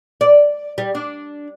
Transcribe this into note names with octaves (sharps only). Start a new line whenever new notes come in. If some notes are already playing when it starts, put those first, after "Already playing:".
D5
G3
D4